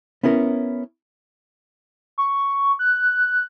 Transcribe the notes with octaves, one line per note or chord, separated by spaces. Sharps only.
B3 C#4 E4 A#4
C#6
F#6